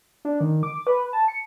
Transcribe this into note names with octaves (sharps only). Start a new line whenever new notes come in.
D4
D#3
D6
B4
A5
C#7